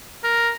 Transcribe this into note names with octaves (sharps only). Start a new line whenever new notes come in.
A#4